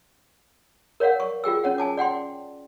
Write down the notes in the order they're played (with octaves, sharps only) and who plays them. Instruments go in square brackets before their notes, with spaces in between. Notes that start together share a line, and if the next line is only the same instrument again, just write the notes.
[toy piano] A#4 C#5 D5 F5 F#5
C#6
F4 G#4 G5 E6
C#4 C#5 F#5
G#5 A5 D6
D5 F#5 G5 C6